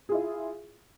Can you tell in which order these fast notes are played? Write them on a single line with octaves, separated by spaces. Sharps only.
G#4 F4 E4